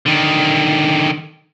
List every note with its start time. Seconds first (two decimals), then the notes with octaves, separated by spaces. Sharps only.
0.06 D3 D#3